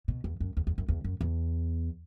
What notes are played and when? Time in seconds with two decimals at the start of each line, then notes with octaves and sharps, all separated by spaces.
0.08 B2
0.24 E2
0.40 F#2
0.57 E2
0.67 E2
0.78 F#2
0.88 E2
1.04 F#2
1.21 E2